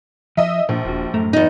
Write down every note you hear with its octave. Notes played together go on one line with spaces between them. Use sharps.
F3 D#5 E5
A#1 A#2 F3
D#1 F4 F#4
F#2 A2 A3 A#5
E2 D#4